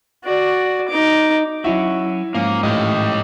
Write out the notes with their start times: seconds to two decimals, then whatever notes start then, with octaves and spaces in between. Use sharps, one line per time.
0.24 F#4 D5
0.89 D#4 D6
1.64 F#3 C#4 E4 F#4 E5
2.35 G#2 F3 A#3 C#4
2.63 A2 G4 D#5